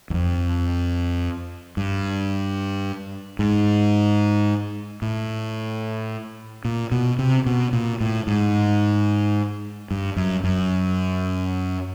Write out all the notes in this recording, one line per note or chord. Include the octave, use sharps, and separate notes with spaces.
E2
F2
G2
G#2
A2
A#2
B2
C3
B2
A#2
A2
G#2
G2
F#2
F#2